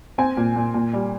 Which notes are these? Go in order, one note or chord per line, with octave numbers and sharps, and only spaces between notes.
C4 G#5
A#2
A#2
A#2
G3